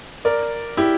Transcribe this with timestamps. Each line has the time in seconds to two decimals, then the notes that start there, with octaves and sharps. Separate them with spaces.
0.25 A#4 D5
0.77 E4 G4